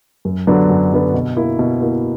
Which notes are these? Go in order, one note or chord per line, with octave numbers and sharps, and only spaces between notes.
F#2
D3 F#3 B3 D4
F#2
D3 F#3 B3 D4
B2
A#3 E4
B2
A#3 E4